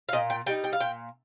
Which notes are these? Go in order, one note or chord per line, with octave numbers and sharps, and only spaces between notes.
F5
A#2 D#5
G5
G3 D#4 G5
G5
F5
A#2 G5